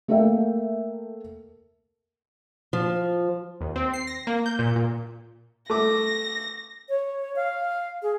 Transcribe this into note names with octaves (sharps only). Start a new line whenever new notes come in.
A3 A#3 A4 A#4 E5 G5
F3
D#2
C4
C7
A#6
A#3
G6
A#2
A#2
A3 D6 A#6
C#5
F5
G#4